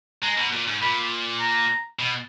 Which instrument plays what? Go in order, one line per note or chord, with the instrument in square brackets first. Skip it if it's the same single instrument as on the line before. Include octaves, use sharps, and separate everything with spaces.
[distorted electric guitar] G#3 [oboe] A#5
[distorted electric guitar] B2
A#2
G#2
[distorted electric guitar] A#2 [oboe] B5
[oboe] A#5
[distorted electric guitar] B2